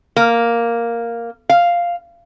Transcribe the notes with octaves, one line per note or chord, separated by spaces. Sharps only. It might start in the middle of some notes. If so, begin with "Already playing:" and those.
A#3
F5